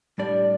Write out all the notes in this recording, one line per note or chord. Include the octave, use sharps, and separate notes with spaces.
A2 G3 D4 D5